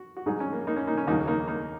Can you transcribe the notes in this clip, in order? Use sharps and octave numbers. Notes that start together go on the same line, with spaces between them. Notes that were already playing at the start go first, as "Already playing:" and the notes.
Already playing: F#4
F#4
G#2 F#3 D#4 G#4
C#4
A#3
A#3 D#4
C#4
A#3 D#4
C#4
D#2 C#3 F#3 A#3 D#4
A#3 D#4
A#3 D#4